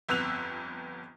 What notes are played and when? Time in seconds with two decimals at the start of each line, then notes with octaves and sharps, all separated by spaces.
0.09 G1 F2 B3 E6 F#6 F7